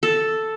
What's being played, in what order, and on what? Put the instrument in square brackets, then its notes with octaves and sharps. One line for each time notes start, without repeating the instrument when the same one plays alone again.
[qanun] A4